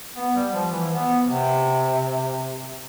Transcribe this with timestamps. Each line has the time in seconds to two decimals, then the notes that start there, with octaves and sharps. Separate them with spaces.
0.16 B3
0.35 G3
0.53 F3
0.71 E3
0.90 B3
1.27 C3